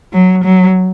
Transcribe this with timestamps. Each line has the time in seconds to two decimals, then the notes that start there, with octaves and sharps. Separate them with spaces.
0.13 F#3
0.44 F#3